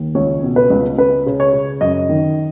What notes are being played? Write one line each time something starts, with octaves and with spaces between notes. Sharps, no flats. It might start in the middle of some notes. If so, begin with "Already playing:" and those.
Already playing: D#2
C#2 C#5
B2
B4
C#2
C#2 B4
C#3
C#5
C#3
F#2 D#5
D#3